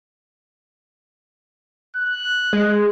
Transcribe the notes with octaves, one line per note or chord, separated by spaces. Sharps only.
F#6
G#3